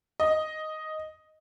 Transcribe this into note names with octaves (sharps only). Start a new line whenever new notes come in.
D#5